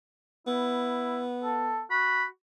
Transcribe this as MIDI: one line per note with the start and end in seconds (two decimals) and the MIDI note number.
0.47 1.84 59
0.47 1.21 64
1.43 1.82 69
1.91 2.26 66
1.91 2.25 83